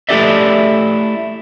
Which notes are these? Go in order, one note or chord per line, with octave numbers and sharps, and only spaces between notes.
A3 E4 G4 A4 D5 E5